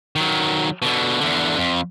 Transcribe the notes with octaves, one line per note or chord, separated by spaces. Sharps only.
D#3 F#3
B2 D3
E2 D3
F2